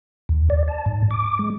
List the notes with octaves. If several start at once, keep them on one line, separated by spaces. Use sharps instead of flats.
D#2
D5
A5
G#2
D6
G#3